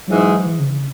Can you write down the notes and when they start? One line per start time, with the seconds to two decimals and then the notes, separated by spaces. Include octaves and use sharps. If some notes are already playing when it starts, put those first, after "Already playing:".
0.07 G#2 E3 F#3 G#3
0.46 E3
0.59 C#3
0.72 C#3